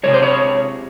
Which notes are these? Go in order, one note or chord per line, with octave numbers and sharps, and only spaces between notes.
C3 F3 G#3 C#5
C5
C#5